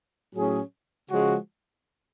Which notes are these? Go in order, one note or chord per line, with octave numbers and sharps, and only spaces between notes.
A2 F#3 C#4 G#4
C#3 F3 G#3 C#4 F#4